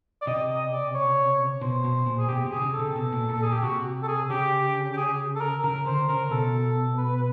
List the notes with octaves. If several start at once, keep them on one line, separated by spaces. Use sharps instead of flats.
D5
C3 D#5
D#5
D5
C#5
B2 C5
B2
A#2
G#4
B2 G4
C3
G#4
C3
C#3
A4
C3
B2
A#2
A#2 A4
A#2 G#4
G4
C3 F#4
A4
G#4
C#3 G4
G4
G#4
A4
A#4
C#3 A#4
D3 C5
C#3 A#4
B2 A4
B4
B4